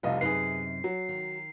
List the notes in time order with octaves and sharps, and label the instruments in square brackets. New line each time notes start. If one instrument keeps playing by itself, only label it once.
[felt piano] F1 C2 D#5 [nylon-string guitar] F4
[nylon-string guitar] F#2 C3 D#4 [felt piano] G#4 B4 [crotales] C7
[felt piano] F#3
[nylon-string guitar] D#3